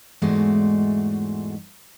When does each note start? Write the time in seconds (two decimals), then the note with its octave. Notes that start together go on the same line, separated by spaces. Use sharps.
0.22 E2 G#2 G#3 A3 F#4 D5